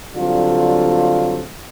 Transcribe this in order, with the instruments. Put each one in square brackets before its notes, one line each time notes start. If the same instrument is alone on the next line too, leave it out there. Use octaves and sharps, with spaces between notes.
[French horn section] D3 F#3 G3 C4 F4